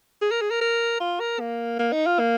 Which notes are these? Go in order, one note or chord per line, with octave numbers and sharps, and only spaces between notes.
G#4
A#4
G#4
A#4
A#4
F4
A#4
A#3
A#3
D#4
F4
A#3